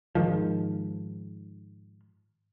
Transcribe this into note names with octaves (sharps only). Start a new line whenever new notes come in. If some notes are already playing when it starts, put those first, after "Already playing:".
G#2 D#3 F3